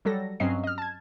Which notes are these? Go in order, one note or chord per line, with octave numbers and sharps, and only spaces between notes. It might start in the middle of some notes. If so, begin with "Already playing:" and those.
F#3 G3 A4 A#6
G2 F#3 C4 C#4 D#5 C7
D#5 F6
A5 G#6